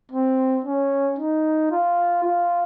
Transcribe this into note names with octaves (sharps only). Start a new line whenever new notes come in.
C4
C#4
D#4
F4
F4